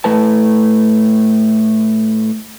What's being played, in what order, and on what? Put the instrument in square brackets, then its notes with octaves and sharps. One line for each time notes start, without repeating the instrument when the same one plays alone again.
[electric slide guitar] A2 A3 B4 A5